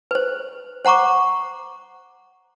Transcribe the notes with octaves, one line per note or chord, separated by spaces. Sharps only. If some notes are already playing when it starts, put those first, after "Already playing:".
B4 C5
C5 F#5 A#5 C#6 D6